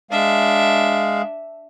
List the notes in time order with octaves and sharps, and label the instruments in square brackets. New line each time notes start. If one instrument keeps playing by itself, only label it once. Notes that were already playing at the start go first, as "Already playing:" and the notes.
[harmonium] G#3 F5 [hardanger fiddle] D4 E5